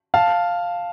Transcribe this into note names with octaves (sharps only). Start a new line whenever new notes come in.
F5 A5